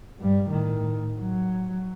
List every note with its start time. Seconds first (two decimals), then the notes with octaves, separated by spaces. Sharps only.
0.19 G2 G3
0.51 A2 D#3
1.20 F#3